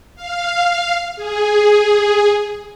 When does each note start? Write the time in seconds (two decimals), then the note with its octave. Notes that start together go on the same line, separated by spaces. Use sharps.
0.15 F5
1.16 G#4